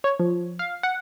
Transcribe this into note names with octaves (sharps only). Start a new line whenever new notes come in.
C#5
F3
F5
F#5